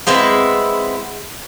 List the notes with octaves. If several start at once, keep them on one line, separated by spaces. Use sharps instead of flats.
G#3 B3 C4 E4